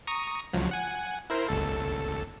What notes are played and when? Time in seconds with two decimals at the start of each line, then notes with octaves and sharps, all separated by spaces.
0.07 A#5 C#6 D#6
0.53 C#2 F3 F#3
0.71 F#5 G#5
1.30 E4 A#4 C5
1.49 G1 C#2 A4